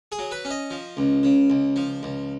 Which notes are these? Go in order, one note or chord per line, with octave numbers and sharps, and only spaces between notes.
G#4
F#3
B4
C#4
D#5
F3
C#2
C#3
C#2
F3
C#2